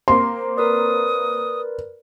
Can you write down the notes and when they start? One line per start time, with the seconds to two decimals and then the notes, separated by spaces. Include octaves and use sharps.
0.08 A#3 C4 C6
0.57 A#4 B4 D5 D#6